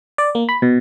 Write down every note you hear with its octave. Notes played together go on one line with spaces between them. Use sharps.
D5
A#3
B5
B2